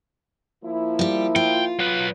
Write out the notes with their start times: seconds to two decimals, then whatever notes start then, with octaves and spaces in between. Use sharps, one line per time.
0.64 F3 A#3 E4
0.99 G3 G4
1.36 F4 G5
1.79 F#3 B4